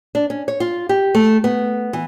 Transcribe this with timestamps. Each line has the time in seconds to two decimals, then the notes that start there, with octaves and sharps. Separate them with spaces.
0.15 D4
0.30 C#4
0.48 C#5
0.60 F4
0.89 G4
1.15 A3
1.44 B3
1.93 E3